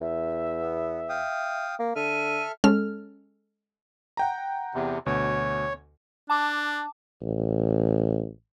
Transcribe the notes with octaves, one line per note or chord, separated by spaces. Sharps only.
E2 E5
B3
F5 G5 D#6
A#3
D3 A4 E5 F6 D#7
G#3 C#4 A4 F6
F#5 G5 A#5
E2 C3
D2 B2 C#5
D4 A5 D6
A1